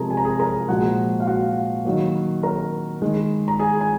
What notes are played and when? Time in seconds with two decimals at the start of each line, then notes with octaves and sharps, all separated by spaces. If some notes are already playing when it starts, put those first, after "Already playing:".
Already playing: C3 F3 G#3 G#4 A#4 A#5
0.10 G#5
0.17 A#5
0.25 G#4 G#5
0.40 A#4 A#5
0.68 A#2 F3 G#3 F#4 F#5
1.20 F5
1.27 F#4 F#5
1.85 D#3 F#3 A#3
2.43 A#4 A#5
3.02 D#3 G#3
3.48 A#5
3.59 G#4 G#5
3.81 G#5